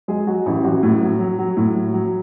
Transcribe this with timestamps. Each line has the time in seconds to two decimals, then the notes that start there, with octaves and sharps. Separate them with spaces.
0.08 F#3 G#3 G#4
0.27 F#3 F#4
0.46 A1 E3 E4
0.64 A1 F#3 F#4
0.83 A2
1.01 F#3
1.19 F#3
1.38 F#3
1.57 A2
1.75 F#3
1.94 F#3